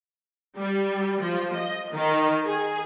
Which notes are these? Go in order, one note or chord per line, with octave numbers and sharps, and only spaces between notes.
G3
F3
D#5
D#3
G#4